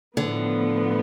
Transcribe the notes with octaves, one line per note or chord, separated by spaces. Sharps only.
A2 D3 F3 B3